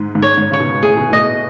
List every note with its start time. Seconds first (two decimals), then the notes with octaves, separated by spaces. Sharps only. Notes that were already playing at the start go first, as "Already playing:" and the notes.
Already playing: G#2
0.15 G#2
0.22 C#5
0.38 G#2
0.51 C#3 C#5
0.60 B2
0.83 A2 G#4
0.97 B2
1.10 A2 D#5